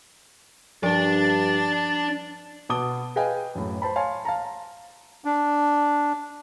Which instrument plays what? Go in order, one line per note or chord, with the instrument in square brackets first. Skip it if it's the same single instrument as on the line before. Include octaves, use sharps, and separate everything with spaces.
[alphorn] G2 [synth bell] F3 [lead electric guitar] D4 D5 [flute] A6
[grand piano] B2 B3 A5 D6 D#6 G7
G#4 B4 D#5 F5 G5 G#5
F#2 A2
C5 A5 B5
C#5 F5 G#5 A5 C6
F5 A5 A#5
[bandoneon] D4